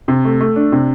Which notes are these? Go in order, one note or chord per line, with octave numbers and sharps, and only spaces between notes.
C3
A3
A3
D4
C3